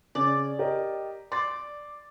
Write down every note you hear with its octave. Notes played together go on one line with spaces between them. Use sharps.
C#3 D5
G4 A#4 D#5
D5 C6 A6